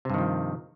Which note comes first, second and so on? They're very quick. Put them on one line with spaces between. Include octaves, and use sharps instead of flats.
C3 G2 D#3 F3